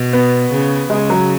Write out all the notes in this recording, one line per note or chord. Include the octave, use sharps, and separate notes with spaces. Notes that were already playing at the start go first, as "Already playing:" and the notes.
Already playing: B2
B3
C#3
C#3 G#3
F#3